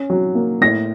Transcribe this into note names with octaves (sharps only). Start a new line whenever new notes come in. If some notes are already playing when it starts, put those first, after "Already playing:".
Already playing: C#4
F#3
A#3
A2 A#6